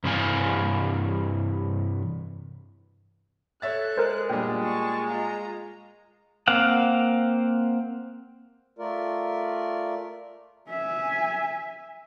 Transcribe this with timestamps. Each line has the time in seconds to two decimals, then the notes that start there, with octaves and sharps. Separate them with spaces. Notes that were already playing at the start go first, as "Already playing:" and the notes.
0.04 G2 C3 E3 C#4 F5 G#5
3.62 A4 C#5 E5 F#6 A6
3.97 G#3 A#4 C5
4.30 A#2 G3 B3 D4 G5
4.62 A5 C#6
5.07 F4 A#5
6.48 A#3 C4 F5 F#5
8.79 A3 F4 A#4 D5
10.69 E5 G#5